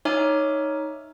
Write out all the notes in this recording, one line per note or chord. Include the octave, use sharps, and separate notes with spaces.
D#4 C#5 E5 G#5 D6 F6